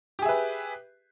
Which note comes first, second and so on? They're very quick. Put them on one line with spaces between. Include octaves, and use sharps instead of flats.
G4 G#4 E5 B4